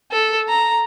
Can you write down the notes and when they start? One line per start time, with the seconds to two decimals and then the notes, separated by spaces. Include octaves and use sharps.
0.12 A4
0.49 A#5